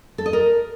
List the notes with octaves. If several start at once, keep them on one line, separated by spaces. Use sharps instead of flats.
A4
D#5
A#4